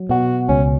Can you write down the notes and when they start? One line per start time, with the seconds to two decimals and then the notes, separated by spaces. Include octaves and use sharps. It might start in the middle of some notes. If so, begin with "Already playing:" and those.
Already playing: F#3
0.09 B2 F#4
0.49 C#2 C#4